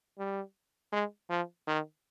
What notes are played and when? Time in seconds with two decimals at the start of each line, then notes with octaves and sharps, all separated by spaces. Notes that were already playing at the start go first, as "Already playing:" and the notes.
0.19 G3
0.92 G#3
1.30 F3
1.68 D#3